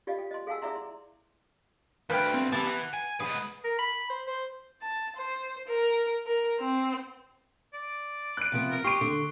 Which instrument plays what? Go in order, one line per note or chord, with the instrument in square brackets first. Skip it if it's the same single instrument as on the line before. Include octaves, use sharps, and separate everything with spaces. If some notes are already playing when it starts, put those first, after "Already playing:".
[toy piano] F4 G4 D5 D#5 F5
G5
D#5 C6
G#4 F5 F#5 G#5 A5 E6
E4 G#4 D5 E5 A#5 C6
C6
[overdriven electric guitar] D2 [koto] B4 [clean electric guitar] F5 G5
[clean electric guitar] C4
[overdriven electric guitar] E3 [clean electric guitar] B3 E4 G4 [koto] A5
[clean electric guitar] F#5
[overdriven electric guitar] G#5
[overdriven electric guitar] G#2 B4 [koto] G#4
[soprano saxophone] A#4
B5
C5
C5
[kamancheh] A5
C5
A#4
A#4
C4
[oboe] D5
[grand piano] F#6 D7
[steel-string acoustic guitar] C3 F3 B3
[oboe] A#4
[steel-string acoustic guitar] G4 [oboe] C6 [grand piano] C#6 D7
[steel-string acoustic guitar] D3